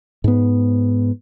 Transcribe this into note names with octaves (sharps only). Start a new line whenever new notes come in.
G#2 B3